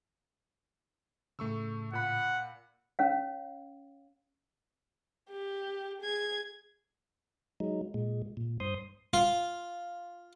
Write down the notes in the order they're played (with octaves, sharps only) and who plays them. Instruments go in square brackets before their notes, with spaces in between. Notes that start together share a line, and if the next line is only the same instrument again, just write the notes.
[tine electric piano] A2 C#3 [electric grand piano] A3 C#6 E6
[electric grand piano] A#2 B5 [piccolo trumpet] F#5
[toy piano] C#4 C#5 F5
[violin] G4
G#4 G#6
[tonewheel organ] F#3 G#3 D#4
A#2 G#3
A#2
G2 C5 C6 D#6
[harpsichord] F4